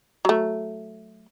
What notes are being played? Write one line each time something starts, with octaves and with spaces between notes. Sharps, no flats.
F#3 A3